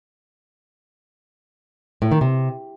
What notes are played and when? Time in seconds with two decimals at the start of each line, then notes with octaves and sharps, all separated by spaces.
2.02 A2
2.11 D#3
2.21 C3